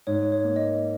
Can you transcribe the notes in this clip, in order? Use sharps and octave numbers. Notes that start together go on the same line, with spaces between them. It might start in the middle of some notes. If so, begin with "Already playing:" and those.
G#2 C#5
C#5
A#3
D#5